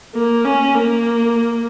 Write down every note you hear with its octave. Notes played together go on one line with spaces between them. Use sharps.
A#3
C#4
A#3